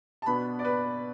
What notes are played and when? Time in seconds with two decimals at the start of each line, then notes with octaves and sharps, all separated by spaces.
0.22 A5
0.26 B2 B3 D4 B5
0.59 D5
0.65 B4